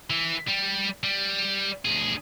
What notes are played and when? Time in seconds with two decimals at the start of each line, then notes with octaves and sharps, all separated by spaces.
0.10 E3
0.48 G3
1.04 G3
1.85 D2 G#4